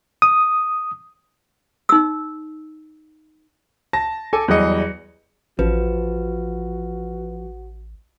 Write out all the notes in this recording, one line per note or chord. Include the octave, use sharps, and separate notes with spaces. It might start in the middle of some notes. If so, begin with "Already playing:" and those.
D#6
D#4 E6
A5 A#6
A4 G#5 D6
E2 F#3 G3 G#4 D#5 C#7
A1 F3 F#4 B4